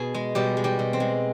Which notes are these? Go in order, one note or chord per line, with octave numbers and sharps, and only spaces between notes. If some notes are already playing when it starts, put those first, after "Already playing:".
Already playing: B2 G#4
G#3
B2 G3 G4
G#3
G3 G4
B2
C4
G#3